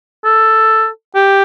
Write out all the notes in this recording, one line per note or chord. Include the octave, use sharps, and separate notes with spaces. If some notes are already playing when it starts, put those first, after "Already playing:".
A4
G4